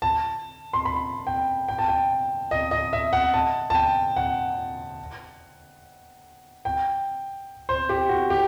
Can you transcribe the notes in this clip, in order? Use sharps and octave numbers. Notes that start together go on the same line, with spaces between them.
A5
C6
B5
G5
G5
A5
G5
D#5
D#5
E5
F#5
A5
A5
G5
F#5
G5
C5
G4
F#4
G4